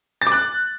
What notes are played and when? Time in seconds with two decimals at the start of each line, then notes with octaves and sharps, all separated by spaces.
0.22 A6
0.27 D6
0.32 F#6